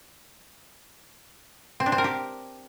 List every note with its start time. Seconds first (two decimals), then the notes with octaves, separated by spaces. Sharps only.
1.80 C4
1.86 D4
1.92 C4
1.98 A#4
2.04 G4